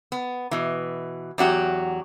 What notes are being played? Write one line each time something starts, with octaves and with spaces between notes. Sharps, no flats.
B3
B2 E3
E2 F#3 F#4 G4